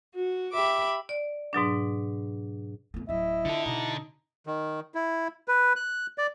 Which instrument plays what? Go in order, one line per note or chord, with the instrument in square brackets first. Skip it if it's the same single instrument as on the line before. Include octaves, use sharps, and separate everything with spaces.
[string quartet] F#4
G4 E5 B5 D6
[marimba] D5
G#2 B2 F#3 D4
[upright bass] E2 A3
[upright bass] D1 F#3 [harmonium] E4 D#5 [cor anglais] E5
[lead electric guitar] D3 A4 [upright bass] F4
[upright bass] B2 [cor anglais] D#4
[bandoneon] D#3
E4
B4
F#6
D5